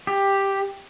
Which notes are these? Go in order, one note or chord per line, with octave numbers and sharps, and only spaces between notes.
G4